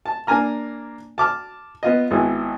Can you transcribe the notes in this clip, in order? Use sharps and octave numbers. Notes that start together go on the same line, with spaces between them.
A5
A#3 D4 G#5 A#5 F6
A5 D6 F6
B3 F4 D#5
G#1 B3 E4 G#4